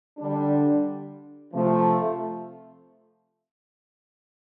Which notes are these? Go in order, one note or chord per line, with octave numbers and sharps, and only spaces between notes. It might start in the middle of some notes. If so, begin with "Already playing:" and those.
D3 G3 D4
C3 F3 A3